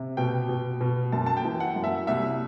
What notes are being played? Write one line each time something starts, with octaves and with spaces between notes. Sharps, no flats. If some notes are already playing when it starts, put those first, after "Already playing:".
Already playing: C3
B2 G5
B2
B2
F#2 A5
A5
G5
E3
F#5
F#2
E5
C2 E5